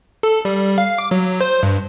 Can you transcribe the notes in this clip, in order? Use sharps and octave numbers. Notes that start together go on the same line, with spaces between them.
A4
G3
F5
D6
F#3
C5
G2